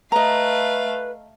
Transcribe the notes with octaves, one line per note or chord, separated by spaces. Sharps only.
A3 B4 D#5 F5 A#5